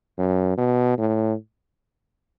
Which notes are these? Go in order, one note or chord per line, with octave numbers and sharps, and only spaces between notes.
F#2
B2
A2